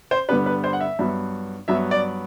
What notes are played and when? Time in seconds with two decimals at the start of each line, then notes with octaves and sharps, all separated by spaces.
0.11 C5
0.29 G2 D3 G3 B3 B4
0.46 B4
0.64 C5
0.73 F#5
0.80 E5
0.99 G2 F#3 B3
1.68 G2 F#3 B3 E5
1.91 D5